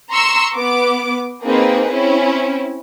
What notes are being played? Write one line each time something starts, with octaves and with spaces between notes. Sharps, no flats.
A#5 C6 C#6 E6
B3 D6
A#3 C4 D#4 G#4 B4
C4 C#4 E4